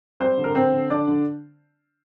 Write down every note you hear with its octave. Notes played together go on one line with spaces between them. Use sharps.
G3 C4 C5
D3
A#4
C4 C5
D3
D3 D4 D5
D3